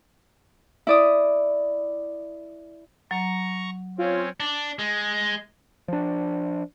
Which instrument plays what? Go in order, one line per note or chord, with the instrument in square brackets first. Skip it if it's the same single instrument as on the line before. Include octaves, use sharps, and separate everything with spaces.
[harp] E4 D5 D#6
[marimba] F#3 [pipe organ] A#5 C#6
[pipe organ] C4 C#4 [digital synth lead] F4 [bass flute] C#5
[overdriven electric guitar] D4
G#3
[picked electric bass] F3 D4